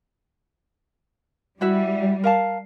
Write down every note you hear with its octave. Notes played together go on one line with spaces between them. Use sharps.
G3 E4 F#4 E5
A#4 F5 A5